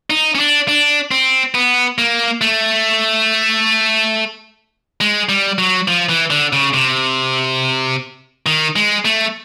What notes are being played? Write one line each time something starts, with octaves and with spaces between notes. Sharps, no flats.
D#4
C#4
D4
D4
C4
B3
A#3
A3
G#3
G3
F#3
F3
E3
D3
C#3
C3
D#3
G#3
A3